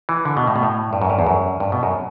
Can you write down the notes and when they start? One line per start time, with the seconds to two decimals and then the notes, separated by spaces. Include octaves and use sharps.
0.09 E3
0.25 D3
0.37 B2
0.47 A2
0.56 B2
0.63 A2
0.93 G2
1.02 F#2
1.10 G2
1.19 E2
1.27 F#2
1.60 G2
1.72 B2
1.83 F#2